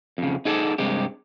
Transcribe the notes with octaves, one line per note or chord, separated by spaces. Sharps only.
F2 C#3
D#4 G#4 A4 C#5 D5
G2 C3 G#3 G4